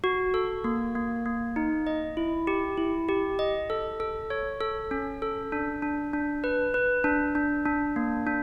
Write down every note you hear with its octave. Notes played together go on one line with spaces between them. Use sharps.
F#4
A4
A#3
A#3
A#3
D#4
D#5
E4
G4
E4
G4
D#5
A4
A4
C#5
A4
C#4
A4
D4
D4
D4
B4
B4
D4
D4
D4
A#3
D4